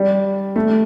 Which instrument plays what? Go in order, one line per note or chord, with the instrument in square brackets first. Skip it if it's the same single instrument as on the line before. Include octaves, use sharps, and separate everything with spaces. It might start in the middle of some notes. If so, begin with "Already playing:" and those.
Already playing: [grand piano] G3
A3